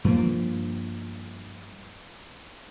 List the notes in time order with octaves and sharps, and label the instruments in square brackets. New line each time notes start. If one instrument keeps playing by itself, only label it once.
[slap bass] G2 F3 A#3